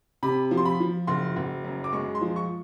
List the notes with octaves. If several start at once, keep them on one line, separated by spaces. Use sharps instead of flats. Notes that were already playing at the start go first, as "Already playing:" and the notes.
C3 B5
F3
C6
B5
F3
F#1 C6
F#1
F#2
D6
G#3 C#6
C6
F3
C#6